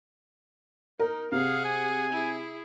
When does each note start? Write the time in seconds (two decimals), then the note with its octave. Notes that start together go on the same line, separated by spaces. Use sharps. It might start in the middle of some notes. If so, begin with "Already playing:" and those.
0.99 D#4 A#4
1.32 C3 G#4 F5 F#5
1.65 G#5
2.12 E4 G#4